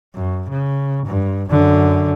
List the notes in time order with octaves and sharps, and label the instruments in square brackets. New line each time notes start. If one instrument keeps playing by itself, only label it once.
[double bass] F#2
C#3
G2
F#2 D3